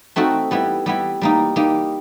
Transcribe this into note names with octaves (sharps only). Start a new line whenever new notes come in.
A3 C4 D#4 F#4 A4
G3 B3 E4
G3 B3 E4
G3 A#3 D#4
G3 A#3 D#4